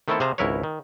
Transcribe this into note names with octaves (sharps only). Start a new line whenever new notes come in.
D#3 A3 B3 C4 E4 A4
C3 G#4 C5 F5 A5 A#5
G#1 C#2 E4 A#4 B4 C#5
D#3